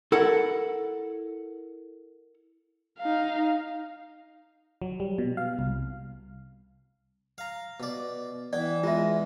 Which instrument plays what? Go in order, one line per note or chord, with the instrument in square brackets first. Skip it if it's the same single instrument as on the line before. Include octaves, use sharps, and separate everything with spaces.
[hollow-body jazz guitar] E4 A4 A#4 F#5
[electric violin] D#4 F5
[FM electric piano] F#3
G3
B2
F5
C2
[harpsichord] F5 A#5
B2 D5
[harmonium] E3 [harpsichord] B3 G5 [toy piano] D5
[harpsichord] E2 G#3 [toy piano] F4 E5